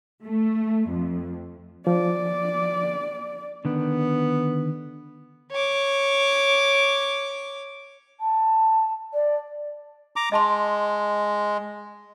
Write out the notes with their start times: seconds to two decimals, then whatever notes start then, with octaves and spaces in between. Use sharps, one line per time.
0.24 A3
0.89 F2
1.87 F3 D5
3.65 D3 D#3 B3 D4
5.52 C#5 D6
8.20 A5
9.14 D5
10.16 A#5 D6
10.32 G#3 D#5 A5 C6